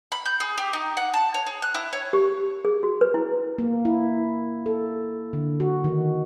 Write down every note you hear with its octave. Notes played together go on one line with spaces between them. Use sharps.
B5
G6
G#4
G4
D#4
F#5
A5
C#5
G#4
F#6
E4
C#5
G4
G#4
F#4
B4
E4
A#3
E4
A4
D3
F#4
D#3